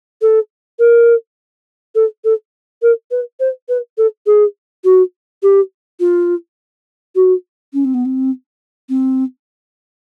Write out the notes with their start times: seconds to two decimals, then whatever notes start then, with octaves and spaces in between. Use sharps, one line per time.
0.22 A4
0.79 A#4
1.95 A4
2.24 A4
2.82 A#4
3.11 B4
3.40 C5
3.69 B4
3.98 A4
4.26 G#4
4.84 F#4
5.43 G4
6.00 F4
7.15 F#4
7.73 C#4
7.85 C4
7.94 B3
8.05 C4
8.89 C4